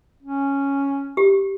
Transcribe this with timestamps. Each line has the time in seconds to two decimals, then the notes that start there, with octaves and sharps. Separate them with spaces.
0.22 C#4
1.17 G4